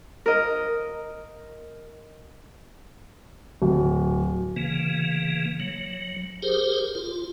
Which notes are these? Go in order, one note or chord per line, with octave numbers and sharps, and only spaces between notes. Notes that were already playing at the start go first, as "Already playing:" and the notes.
A#4 D#5
D1
C#3 E3 A#3
F#3
G4 G#4 A#4 C5
F4